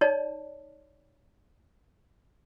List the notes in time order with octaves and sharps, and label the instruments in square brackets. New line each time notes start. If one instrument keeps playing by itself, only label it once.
[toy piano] D#4 C#5 D5 A5